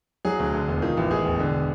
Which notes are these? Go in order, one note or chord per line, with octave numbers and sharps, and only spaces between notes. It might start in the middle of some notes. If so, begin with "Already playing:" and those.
F#3 G#4
D2
D3
E1
D#3 F4
A1
D#3 G#4
E1
D3